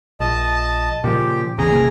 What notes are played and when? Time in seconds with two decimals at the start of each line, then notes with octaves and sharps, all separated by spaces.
0.20 A#1 D#5 A5
1.04 A#2 C#3 F3 G4
1.58 A1 E2 C#3 G#4 A#5
1.71 G1 C3 A#3